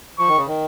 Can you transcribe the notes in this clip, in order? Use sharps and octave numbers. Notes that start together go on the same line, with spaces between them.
F3 C#6
D#3
C#3
D#3